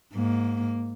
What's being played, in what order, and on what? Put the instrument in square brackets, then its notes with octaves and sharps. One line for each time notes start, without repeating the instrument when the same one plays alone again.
[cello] G#2 A#3